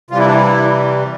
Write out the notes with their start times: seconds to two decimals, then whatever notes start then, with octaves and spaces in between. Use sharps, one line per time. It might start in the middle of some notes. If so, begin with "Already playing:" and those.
0.10 C3 E3 G3 F4
0.19 E4
0.26 D4
0.34 E4